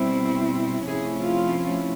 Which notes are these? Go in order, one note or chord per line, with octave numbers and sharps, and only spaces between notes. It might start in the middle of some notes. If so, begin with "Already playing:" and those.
Already playing: B2 G3 C4 E4
C3 F3 A3 C#4 E4 G#4
F4